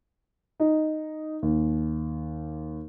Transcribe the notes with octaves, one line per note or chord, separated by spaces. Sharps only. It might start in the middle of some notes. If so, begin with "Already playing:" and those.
D#4
D#2